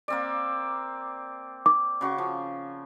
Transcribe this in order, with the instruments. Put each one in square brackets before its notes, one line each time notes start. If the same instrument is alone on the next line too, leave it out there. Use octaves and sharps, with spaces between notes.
[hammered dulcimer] A#3 C4 D5
[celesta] D6
[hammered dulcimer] C#3 F#4 C#6
F3